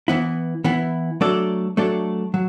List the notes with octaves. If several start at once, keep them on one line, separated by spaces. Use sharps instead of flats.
E3 B3 E4
E3 B3 E4
F#3 A3 D4 A4 D5
F#3 A3 D4 A4 D5
F#3